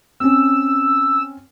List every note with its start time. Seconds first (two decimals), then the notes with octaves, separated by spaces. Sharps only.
0.20 C4 C#4 E6